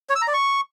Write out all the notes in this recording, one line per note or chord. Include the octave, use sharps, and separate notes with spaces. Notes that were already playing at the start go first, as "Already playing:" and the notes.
C#5
E6
A#5
D5
C#6